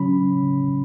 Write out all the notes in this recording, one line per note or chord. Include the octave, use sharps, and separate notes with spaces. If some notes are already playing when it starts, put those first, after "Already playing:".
Already playing: C#3 F#3 C#4 B5